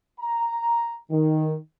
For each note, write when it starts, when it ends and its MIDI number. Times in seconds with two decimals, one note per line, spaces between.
0.20 0.97 82
1.10 1.53 51